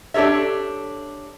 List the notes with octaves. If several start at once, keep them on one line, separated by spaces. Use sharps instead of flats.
D4 G4 A4 C#5 E5